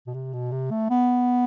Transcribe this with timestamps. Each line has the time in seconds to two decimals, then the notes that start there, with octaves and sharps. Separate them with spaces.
0.07 B2
0.14 C3
0.33 B2
0.52 C3
0.71 A3
0.90 B3